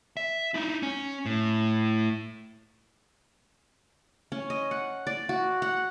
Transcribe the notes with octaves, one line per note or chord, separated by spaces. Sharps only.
E5
D#4 E4
C#4
A2
C#4
D#5
F#5
D5
F#4
F#5